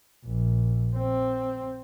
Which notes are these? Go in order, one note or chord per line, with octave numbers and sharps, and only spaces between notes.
A#1
C4